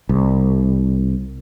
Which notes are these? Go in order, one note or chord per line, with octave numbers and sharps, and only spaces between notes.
C2